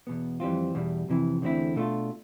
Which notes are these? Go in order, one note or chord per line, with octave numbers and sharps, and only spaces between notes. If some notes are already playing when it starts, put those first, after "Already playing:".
E2 B2 B3
F2 E3 G3 C4 F4
E2 B2 G3
F2 C3 E3
E2 D3 A3 C4 E4
B2 A3 D4 F4